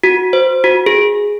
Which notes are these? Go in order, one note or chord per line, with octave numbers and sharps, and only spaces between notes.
F#4
C5
F#4
G#4